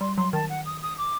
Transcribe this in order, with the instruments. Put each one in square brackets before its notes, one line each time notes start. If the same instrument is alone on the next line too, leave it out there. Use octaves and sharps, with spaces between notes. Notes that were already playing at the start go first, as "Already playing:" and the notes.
[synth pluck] G3 [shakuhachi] C6
[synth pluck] F#3 [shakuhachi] C6
[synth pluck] D#3 [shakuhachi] A5
[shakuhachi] F#5
D#6
D#6
D6